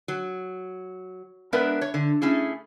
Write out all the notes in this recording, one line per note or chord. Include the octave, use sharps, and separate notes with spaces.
F#3
G#3 B3 D4 A#4 B4 E5
C#5
D3
A3 C#4 E4 G#4